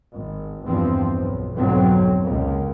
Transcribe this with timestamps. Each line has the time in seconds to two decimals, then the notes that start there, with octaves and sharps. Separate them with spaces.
0.15 G#1
0.64 E2 G2 F3 C4
1.14 B1
1.53 B1 F2 G#2 D3 F#3 C4
2.22 C#2 A#3